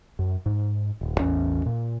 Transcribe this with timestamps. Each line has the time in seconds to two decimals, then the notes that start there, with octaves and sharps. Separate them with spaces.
0.19 F#2
0.46 G#2
1.01 D#1
1.20 A1 E2 C#4
1.66 A#2